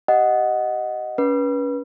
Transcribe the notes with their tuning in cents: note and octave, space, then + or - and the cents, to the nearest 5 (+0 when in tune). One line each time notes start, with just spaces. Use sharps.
G4 -15 D#5 +0 F#5 +0
C#4 +25 B4 -25